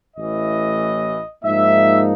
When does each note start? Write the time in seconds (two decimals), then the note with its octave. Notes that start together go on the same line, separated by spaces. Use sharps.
0.15 A1 A2 E3 D#5
1.43 G#2 F3 A#3 D#4 E5